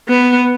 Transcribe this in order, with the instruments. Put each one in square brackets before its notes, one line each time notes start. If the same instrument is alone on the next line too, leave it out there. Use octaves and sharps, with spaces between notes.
[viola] B3